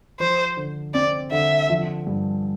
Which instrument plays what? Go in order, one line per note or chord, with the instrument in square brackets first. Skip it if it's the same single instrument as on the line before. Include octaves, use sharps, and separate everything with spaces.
[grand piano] F3 [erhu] C5
[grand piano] D3
[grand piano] C4 [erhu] D5
[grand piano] D3 [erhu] E5
[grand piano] F3
G2